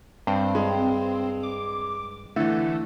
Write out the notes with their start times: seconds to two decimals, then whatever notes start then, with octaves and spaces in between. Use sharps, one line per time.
0.27 G2 C4
0.55 G#3
1.43 D6
2.36 D3 E3 A3 E4